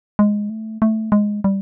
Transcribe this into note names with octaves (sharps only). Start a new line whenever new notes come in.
G#3
A3
A3
G#3
G3